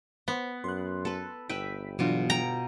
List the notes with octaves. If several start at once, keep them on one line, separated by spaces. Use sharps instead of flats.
B3 C5
F#2 C6 F#6
A4 B4
G1 B4 E5 G5 B6
B2 E3 F#3 D4 F4
G5 A#5